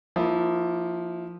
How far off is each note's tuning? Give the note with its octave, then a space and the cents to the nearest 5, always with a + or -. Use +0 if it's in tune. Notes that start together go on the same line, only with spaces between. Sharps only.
F3 +0 A#3 +0 E4 -25